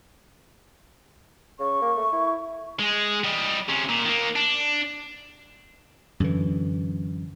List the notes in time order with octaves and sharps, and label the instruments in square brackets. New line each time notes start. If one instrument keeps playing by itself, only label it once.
[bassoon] C#3 [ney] C#6
[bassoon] A#3
A3
E4
[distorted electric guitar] G#3 G#4
G3 D#5
C3 C#4
A#2
D#3 A#3
D4
[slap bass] F#2 D3 E3